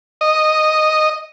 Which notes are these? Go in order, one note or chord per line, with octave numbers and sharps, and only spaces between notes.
D#5